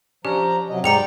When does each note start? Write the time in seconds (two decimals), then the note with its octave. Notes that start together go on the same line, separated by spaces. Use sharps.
0.25 F3 C#4 D4 G4 A#5
0.70 C3 F#3 D#5
0.84 G#2 G3 D5 G5 A#5 C#7 F7